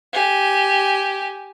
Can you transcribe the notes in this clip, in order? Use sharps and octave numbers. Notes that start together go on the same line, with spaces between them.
G4 G#5